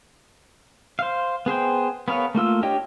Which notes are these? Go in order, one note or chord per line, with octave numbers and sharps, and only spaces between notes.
C5 F5
B3 G#4 C5 G5
B3 G#4 A#4 C#5 F5
A3 A#3 F4 E6
D4 G4 C#5 D#5 G5